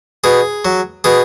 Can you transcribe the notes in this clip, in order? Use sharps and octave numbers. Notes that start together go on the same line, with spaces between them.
B2 G#4
F#3
B2 G#4